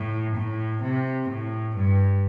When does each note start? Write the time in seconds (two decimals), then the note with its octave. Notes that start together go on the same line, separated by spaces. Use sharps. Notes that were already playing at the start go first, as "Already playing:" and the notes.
Already playing: A2
0.35 A2
0.82 C3
1.29 A2
1.76 G2